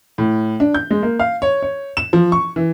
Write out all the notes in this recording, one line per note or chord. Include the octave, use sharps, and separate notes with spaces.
A2
D4
G6
G#3
A#3
F5
C#5
C#5
E7
F3
C#6
E3